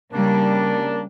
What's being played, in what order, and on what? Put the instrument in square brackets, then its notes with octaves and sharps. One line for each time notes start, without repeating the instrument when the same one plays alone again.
[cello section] C#3 G3 [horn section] A#3 D4